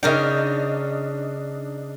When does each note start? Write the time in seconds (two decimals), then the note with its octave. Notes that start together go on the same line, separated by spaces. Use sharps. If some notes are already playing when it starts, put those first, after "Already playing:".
0.03 C#3 D4 D#4 A#4 D#5 G5